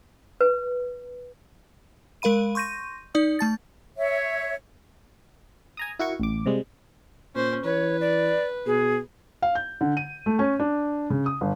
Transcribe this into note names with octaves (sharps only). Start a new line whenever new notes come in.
B4
G#3 A#4 F5 B5 D#7
C6 C#6 G6 A#6 D#7
D#4 D5 D#6
A3 A5 A6
C#5 E5
G#5 A#5 D#6
E4 F#4 A#4 C#6
A1 D6
C3 G3 G#3
A#2 C#4 C5
E3 B4 C#5
D5
B2 G#4
F5
G6
D3
D#7
A3
C#4
D4
C#3
D#6
G1